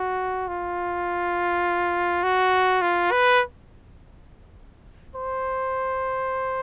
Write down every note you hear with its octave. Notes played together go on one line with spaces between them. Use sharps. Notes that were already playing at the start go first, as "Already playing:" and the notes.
Already playing: F#4
F4
F#4
F4
B4
C5